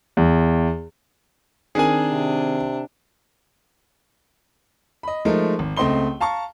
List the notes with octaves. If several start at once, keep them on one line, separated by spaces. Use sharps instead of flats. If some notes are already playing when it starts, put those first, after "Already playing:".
E2
D#3 C4 D4 G#4 A#4 G#5
C3
D#5 B5
F3 G#3 A3 D#4 A#4
G#1
C#2 A3 C4 D#5 C6 G7
F5 A5 A#5 C#6